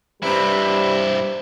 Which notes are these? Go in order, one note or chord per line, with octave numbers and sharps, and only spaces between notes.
G2 C3 G3 E4 B4